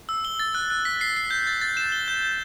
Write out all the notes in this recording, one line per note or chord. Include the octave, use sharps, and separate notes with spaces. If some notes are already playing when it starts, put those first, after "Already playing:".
E6
G7
A6
F#6
F#6
B6
C7
C7
G6
A6
A6
E7
G7
G6
G6